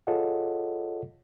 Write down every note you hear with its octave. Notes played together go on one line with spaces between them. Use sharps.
F4 G#4 A4 C#5 D#5 F#5